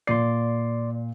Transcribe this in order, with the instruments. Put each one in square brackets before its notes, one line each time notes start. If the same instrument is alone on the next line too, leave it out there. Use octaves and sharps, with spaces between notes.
[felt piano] A#2 C7 [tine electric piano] D5 C6